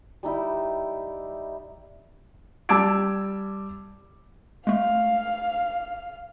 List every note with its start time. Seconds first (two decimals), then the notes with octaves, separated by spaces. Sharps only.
0.23 G3 D#4 E4 G4
2.69 G3 A5 D6 E6 G#6 D7
4.67 G#3 A3 F5